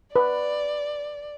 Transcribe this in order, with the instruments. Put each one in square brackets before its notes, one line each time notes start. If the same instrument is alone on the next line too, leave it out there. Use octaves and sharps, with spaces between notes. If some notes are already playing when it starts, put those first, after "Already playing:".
[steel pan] B4 [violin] D5